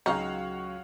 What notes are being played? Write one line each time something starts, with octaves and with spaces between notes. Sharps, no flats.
C#2 F#3 G#3 D#4 F#4 C#5 F5 F6